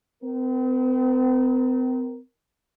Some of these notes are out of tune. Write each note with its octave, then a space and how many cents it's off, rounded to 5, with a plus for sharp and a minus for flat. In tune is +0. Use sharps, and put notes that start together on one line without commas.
C4 -40 A#4 +0